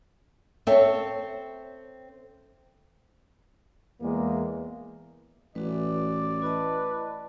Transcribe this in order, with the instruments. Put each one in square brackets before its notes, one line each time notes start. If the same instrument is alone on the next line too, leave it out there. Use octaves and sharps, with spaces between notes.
[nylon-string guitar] C4 A4 C#5 E5
[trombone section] E2 G#3 A#3
[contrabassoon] A1 [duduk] E3 [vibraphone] F#4 B4 [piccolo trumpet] D5
[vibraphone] E4 D#5 A5 [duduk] B4